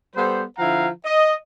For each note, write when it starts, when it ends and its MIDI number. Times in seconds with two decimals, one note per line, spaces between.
0.15 0.43 55
0.15 0.43 59
0.15 0.43 69
0.15 0.43 72
0.58 0.88 50
0.58 0.88 53
0.58 0.88 64
0.58 0.88 77
0.58 0.88 78
0.58 0.88 82
1.05 1.34 75